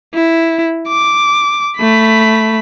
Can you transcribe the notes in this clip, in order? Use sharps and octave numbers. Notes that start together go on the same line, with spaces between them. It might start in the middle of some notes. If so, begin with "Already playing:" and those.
E4
D6
A3 B5